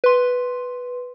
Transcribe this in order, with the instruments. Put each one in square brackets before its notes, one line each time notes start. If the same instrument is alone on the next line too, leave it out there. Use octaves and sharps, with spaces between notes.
[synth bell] B4 C6